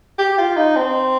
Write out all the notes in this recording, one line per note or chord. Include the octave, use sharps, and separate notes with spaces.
G4
F4
D#4
C4